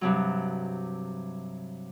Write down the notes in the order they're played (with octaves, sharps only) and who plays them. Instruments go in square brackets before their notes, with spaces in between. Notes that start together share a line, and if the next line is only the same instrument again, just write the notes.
[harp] G2 C3 F#3